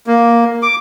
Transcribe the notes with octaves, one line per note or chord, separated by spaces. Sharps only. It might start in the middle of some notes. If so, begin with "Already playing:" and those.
A#3
D6